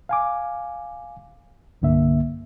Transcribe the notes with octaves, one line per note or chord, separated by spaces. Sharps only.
F5 G#5 D6
C2 G2 D3 A#3 E5